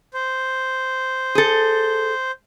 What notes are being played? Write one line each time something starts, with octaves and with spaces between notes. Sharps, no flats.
C5
G#4 A4